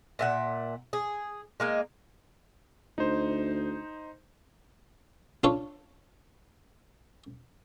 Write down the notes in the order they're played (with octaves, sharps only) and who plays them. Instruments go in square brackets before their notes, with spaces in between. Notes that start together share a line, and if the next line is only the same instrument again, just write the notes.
[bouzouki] A#2 E5 F#5
G#4
G#3 A#3 D#4
[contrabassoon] D2 [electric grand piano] D#4 C5
[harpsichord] D4 F4 A4 C#5